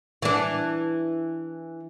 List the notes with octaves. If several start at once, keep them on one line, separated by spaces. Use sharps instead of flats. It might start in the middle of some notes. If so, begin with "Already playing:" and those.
E3 D4